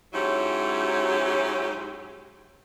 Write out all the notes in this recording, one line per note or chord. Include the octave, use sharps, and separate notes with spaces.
G#2 F#3 C#4 E4 G4